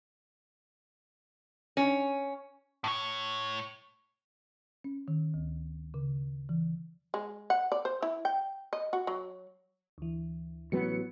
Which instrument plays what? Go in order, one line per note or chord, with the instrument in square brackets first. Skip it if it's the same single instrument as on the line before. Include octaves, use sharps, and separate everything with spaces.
[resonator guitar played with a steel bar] C#4
[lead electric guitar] A2 C#5
[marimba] C#4
D#3
D2
C#3
E3
[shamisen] G#3
F#5
D5
C5
E4
G5
D#5
F#4
F#3
[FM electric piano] D2 E3
[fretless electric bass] A1 F#3 B3 [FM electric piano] C#7